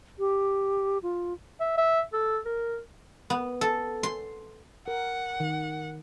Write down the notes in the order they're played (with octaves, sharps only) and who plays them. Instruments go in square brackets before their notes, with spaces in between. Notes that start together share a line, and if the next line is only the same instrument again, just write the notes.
[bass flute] G4
F4
[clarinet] E5
E5
A4
A#4
[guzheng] B3
A4
C6
[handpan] A#4 [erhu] F#5
[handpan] D#3